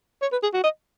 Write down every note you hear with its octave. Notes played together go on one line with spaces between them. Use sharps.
C#5
B4
G#4
F#4
D#5